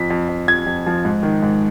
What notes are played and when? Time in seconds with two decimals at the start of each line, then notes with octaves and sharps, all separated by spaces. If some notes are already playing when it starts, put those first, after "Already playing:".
Already playing: F2 B6
0.10 F2
0.28 F2
0.48 F2 G#6
0.66 F2
0.86 F3
1.05 G#2
1.23 D#3
1.42 G#2